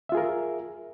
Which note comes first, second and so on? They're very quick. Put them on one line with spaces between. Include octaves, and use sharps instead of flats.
E5 F4 G#4 A#4